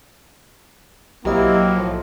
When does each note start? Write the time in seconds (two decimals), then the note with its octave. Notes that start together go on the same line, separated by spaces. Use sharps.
1.25 B1 F#3 A#3 C4 E4 G4 D#5
1.72 A2 F3